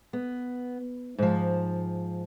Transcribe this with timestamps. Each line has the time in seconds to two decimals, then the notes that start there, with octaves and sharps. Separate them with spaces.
0.13 B3
1.18 G#2 F3